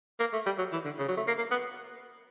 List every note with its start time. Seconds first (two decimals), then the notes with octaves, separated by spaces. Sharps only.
0.20 A#3
0.33 A3
0.46 G3
0.58 F#3
0.72 E3
0.85 D3
0.99 C#3
1.08 F#3
1.17 A3
1.27 A#3
1.38 A#3
1.51 B3